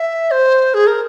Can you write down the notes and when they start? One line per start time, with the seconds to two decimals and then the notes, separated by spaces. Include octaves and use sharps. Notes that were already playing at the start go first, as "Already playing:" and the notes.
Already playing: E5
0.31 C5
0.74 G#4
0.87 A#4